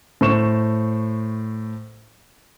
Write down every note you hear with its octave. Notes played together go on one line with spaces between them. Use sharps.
A2 C5 C#6 E7